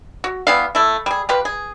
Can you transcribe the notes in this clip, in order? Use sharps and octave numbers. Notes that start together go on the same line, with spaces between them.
F#4
E3 G3 B3 F5
A3 E4
G3 G#4
F4 G4 B4
G#4